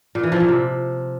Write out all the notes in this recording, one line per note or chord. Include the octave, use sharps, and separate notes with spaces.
A#2
E3
F3
A#2
C3